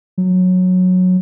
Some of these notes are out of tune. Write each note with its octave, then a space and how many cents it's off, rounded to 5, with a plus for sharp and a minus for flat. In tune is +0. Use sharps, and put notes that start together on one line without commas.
F#3 -15